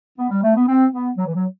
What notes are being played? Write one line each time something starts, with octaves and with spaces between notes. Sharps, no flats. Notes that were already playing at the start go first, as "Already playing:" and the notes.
B3
G3
A3
B3
C4
B3
F#3
E3
F#3